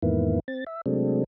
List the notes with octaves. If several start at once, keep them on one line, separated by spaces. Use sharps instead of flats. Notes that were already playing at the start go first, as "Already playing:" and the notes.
E2 G#2 D#3 A#3 B3 E4
C4 A6
E5
C3 F#3 G#3 A3 C4 D4